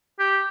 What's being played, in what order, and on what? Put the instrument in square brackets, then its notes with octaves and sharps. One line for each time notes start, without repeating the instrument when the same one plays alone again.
[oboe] G4